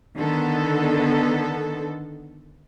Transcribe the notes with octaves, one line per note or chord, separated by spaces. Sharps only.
D3 D#3 B3 A4